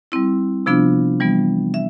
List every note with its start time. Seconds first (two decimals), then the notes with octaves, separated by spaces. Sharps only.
0.12 G3 C4 E4
0.66 C3 F3 B3 D4 F4
1.20 E3 G3 B3
1.74 E5